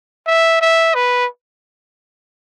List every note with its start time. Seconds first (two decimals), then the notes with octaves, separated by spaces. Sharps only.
0.26 E5
0.61 E5
0.95 B4